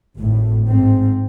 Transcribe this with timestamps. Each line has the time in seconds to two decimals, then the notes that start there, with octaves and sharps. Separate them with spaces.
0.17 G#1 A2
0.66 G#2 C4